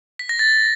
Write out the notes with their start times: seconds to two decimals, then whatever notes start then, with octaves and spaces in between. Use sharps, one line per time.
0.19 B6
0.29 A#6
0.39 A6